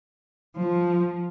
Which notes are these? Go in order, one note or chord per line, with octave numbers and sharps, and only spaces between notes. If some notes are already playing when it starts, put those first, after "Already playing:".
F3